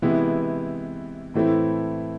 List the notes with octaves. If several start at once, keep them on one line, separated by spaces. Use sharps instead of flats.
C3 E3 G#3 B3 E4
A2 E3 A3 C4 E4